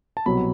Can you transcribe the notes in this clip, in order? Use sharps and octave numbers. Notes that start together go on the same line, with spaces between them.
A5
C2 B2 F#3 C4 B5